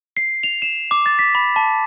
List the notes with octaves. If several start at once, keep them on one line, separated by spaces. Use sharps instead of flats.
C7
F7
E7
D6
A6
B6
B5
A5